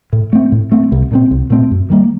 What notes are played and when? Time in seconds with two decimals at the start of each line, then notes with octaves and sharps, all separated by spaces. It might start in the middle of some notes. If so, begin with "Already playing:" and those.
0.13 A2
0.33 A3 C4
0.52 A2
0.72 A3 C4
0.92 C2
1.12 A#2 A3 C4
1.31 C2
1.50 A#2 A3 C4
1.71 F#2
1.90 D#3 G3 A#3